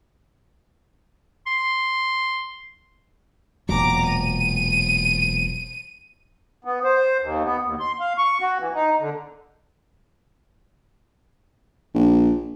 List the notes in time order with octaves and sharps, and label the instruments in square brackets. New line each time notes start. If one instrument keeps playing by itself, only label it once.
[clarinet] C6
[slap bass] E1 A#2 F#3 [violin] A#5 D6
[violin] D#7
[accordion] B3
C5
D#2
B3
D#2
C6
F5
C#6
F#4
E3
D#4
D3
[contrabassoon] A#1